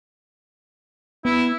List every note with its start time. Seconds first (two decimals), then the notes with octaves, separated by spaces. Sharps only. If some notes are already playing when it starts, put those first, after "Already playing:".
1.25 B3 E4